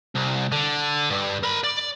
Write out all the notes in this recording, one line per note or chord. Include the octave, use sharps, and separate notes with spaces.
C2
D3
G2
A#4 B5
D5